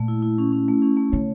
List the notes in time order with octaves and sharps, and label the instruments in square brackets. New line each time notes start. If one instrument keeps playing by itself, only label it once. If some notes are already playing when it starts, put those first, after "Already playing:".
Already playing: [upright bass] A#2 [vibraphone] A3
[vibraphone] E4
E4
C#4
C#4
A3
C#4
A3
[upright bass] C#3 [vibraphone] C#5